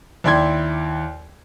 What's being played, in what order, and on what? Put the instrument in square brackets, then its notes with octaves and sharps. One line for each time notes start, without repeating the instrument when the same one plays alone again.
[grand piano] D#2 E4 D5 G5 C6 G#6